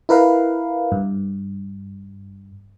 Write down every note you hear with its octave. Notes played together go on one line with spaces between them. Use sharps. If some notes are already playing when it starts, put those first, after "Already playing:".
E4 A#4 B4 F5
G2